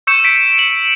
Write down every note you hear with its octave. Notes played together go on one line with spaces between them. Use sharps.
C#6 E6 G6 C#7 E7
B6 D7
D7 F#7